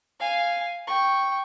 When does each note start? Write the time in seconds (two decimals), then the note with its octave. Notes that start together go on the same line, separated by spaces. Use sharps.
0.20 F5 G#5
0.87 G5 C#6